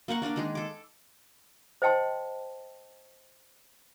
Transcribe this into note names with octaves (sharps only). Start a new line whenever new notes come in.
A#3 A#4 F#5 C#6
A#3 D4 A#4 D5
D#3 G#3 G#4
A4 D6
C5 D#5 G5 A5 C6